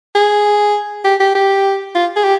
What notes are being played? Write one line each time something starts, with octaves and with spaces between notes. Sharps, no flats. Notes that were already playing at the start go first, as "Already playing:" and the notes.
G#4
G4
G4
G4
F4
G#4
G4